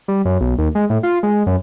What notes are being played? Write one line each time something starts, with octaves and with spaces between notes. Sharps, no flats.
G3
F#2
B1
D#2
G#3
A2
F4
G#3
F#2